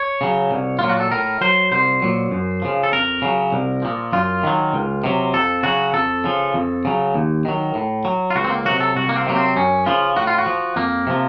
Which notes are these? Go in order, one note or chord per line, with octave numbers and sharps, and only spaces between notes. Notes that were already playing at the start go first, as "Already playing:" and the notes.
Already playing: C#5
C#3 F#3
C2
A#2 F#3 F4
F#4
A4
A2 A#4
F#3 C5
C2 C5
A#2 F#3
F#2
C#3 F3
A4
F2 A#4
C#3 F#3
C2
A#2 F3
F#2 F4
D#3 F#3
C#2
C3 F#3
F2 A4
C#3 F#3 F#4
F2 A4
C#3 F3
F2
C#3 F#3
D#2
D#3 F#3
A2
F#3
F4
C#2 F#4
C4
A#3
C3 F#3 F#4
A4
C2 F#4
A#3
C4
C3 D#3 F#3 A#3
C4
F#2 C#4
C#3 F3 F4
A2 F#4
F4
F#4
F3
F2 A#3
C3 F3